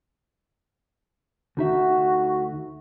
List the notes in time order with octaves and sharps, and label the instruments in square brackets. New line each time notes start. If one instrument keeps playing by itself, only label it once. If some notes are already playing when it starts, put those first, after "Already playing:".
[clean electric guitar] D2 D#4 E5 [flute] F#4